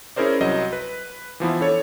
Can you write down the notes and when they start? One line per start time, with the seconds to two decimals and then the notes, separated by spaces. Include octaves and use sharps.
0.16 C#4 E4 G#4 A#4 C5 D5
0.40 C2 F#3 D#5
0.73 B4
1.40 E3 F3 B3 E4
1.61 D4 A4 C#5